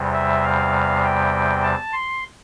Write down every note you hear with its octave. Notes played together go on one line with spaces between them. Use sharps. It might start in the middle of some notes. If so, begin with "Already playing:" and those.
Already playing: E2 C3 G3
E5
F5
G5
A5
C6